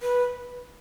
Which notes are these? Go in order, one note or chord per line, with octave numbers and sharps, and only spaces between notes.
B4